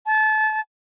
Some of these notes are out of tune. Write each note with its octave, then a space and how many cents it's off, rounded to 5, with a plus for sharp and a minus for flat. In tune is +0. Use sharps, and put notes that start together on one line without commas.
A5 -30